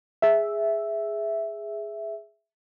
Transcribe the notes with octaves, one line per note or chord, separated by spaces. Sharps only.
G#4 E5